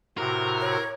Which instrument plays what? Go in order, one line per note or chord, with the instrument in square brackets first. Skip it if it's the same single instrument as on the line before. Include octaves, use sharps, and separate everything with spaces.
[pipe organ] A2 C3 F#4 [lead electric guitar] A#4
[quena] C#5